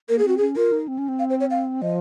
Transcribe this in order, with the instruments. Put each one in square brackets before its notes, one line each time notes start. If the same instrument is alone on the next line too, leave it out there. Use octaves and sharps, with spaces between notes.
[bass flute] A#3 [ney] A#4
[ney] G#4
[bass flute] C4 [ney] F#4
[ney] G#4
[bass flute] C#4
[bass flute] F4 [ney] A#4
[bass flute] D#4
C4
C#4
C4
[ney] F5
C5
C#5
F5
[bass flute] F3 [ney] D#5